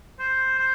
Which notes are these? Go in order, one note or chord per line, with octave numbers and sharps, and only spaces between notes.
C5
C5